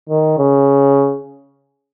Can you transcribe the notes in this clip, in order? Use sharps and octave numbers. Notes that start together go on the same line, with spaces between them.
D#3
C#3